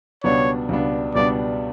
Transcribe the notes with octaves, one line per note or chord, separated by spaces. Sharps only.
C#2 B2 G3 B3 D4 C#5
C#2 B2 G3 B3 D4
C#2 B2 G3 B3 D4 D5